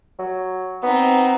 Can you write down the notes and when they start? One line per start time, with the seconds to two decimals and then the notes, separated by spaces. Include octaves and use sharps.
0.19 F#3
0.83 B3 C4 D#4